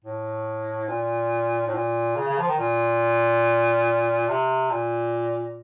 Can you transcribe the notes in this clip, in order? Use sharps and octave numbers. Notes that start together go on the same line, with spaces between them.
A2
A#2
A2
A#2
C#3
C#3
F3
D#3
A#2
C3
A#2